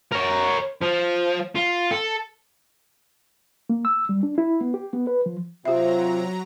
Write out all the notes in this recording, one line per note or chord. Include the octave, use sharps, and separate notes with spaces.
A#4 C#5
F3
F4
A4
A#3
E6
G3
D4
E4
B3
G4
B3
B4
F3
C3 F#3 C4 F4 G4 E5 A#5